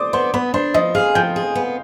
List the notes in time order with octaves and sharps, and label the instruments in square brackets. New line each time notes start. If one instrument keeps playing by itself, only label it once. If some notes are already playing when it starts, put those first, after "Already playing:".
Already playing: [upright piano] C5 D5 C6 D6 D#6
[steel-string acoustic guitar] B3 [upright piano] C5 C6
[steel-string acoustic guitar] B3 [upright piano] B4 B5
[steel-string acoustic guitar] D4 [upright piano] C5 C6
[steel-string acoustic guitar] F3 [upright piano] D#5 D#6
[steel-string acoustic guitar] G#4 [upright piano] F5 F6
[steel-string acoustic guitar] F3 [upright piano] G5 G6
[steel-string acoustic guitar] G#4
B3